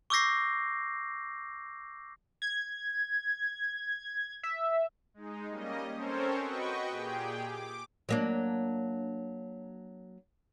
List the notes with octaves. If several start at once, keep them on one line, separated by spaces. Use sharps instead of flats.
C#6 D6 E6 G6 A#6 C7
G#6
E5
G#3 D#4
G3 A#3 C#4 D#5
C4 C#4 A4 A#4 C5 C#5
F#4 B4 D#5 G5 C#6
A#2 G4 G#4 G5
D6
F#3 A#3 D4